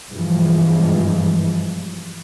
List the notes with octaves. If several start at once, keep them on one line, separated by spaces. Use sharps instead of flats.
G2 B2 E3 F3 G3 G#3